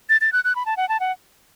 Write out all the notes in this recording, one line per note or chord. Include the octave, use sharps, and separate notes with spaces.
A6
A6
F#6
F#6
B5
A5
F#5
A5
F#5